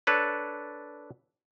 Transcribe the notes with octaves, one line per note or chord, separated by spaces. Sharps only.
D4 A4 B4 C#5